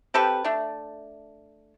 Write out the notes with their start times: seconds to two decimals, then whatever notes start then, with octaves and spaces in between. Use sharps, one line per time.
0.14 C4 G4 A4 B4
0.45 A3 D4